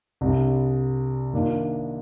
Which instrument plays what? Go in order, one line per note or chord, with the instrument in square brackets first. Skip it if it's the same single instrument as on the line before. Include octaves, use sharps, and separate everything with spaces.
[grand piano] C2 C3 G3 D4
D#3 A#3 D4 F4